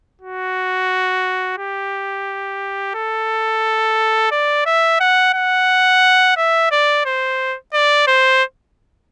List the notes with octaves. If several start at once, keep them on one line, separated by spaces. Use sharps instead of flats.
F#4
G4
A4
D5
E5
F#5
F#5
E5
D5
C5
D5
C5